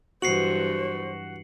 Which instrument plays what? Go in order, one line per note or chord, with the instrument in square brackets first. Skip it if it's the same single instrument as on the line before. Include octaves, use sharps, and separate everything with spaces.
[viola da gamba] G2 E3 F#3 [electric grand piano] F#4 [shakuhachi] C5 [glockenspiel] C7 C#7 F#7